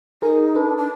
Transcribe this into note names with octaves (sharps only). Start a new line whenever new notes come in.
D#4 G#4 A#4
D4 A4 B4
D4